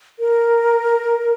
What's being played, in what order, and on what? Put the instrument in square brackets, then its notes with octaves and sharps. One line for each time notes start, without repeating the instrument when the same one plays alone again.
[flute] A#4